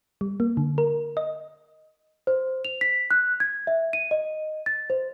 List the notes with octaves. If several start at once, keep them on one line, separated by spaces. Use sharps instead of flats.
G3
A#3
D3
A#4
D#5
C5
F7
B6
F#6
G#6
E5
D#7
D#5
A6
C5